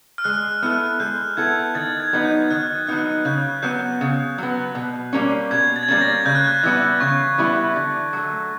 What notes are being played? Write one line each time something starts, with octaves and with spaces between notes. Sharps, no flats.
F6
G#3 F#6
B3 E4 A4 F#6
G#3 G6
B3 E4 A4 G#6
D#3 A6
G#6
F#3 B3 D#4
G6
D#3 F#6
F#3 B3 D#4 F#6
C#3 G6
F#3 B3 G6
C#3
F#3 B3
B2
G3 A#3 C#4
B2 G#6
A6
G#6
G3 A#3 C#4 A6
A#6
C#3 G6
F#6
G6
E3 G3 B3 E4
C#3 C#6
E3 G3 B3 E4
D3
F#3 A3